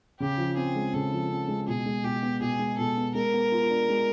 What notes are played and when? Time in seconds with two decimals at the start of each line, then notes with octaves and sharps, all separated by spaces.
0.20 C#3 G4
0.38 F3
0.57 C4 G#4
0.76 G#3
0.94 C#3 A4
1.12 F3
1.30 C4
1.48 G#3
1.68 B2 G#4
1.86 G#3
2.04 B2 G4
2.22 B3
2.41 B2 G#4
2.59 G#3
2.78 B2 A4
2.97 B3
3.14 G#3 A#4
3.33 B3
3.52 F4
3.70 D4
3.89 G#3